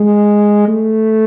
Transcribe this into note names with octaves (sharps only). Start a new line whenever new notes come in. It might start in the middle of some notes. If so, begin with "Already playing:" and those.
Already playing: G#3
A3